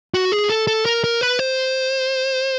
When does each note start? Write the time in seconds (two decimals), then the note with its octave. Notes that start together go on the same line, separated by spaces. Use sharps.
0.14 F#4
0.32 G#4
0.49 A4
0.67 A4
0.86 A#4
1.04 A#4
1.21 B4
1.39 C5